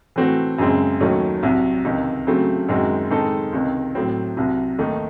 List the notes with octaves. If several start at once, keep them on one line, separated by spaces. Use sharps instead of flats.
E3 A3 C4 F#4
F#2 C#3 G#3 C4
D#2 D#3 F#3 A3 C#4
C2 C3 F#3
C#2 C3 D#3
C#3 F#3 A3 C4
F#2 D#3 G#3 C4 F#4
D#3 G#3 C4 D#4 A4
C#2 C3 D#3
A2 F#3 C4
C2 C3 F#3
D#2 D#3 A3 D#4